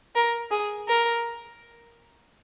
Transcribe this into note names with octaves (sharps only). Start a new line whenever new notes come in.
A#4
G#4
A#4